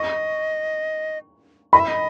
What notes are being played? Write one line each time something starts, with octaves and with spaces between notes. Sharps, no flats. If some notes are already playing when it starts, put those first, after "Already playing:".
Already playing: D#5 C#6
D#5 B5
E5
D#5